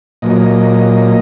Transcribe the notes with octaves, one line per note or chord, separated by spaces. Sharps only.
A#2 F#3 A#3 D#5